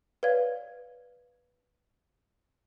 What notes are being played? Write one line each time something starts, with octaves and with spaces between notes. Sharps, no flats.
B4 C#5 D5 F5 G#6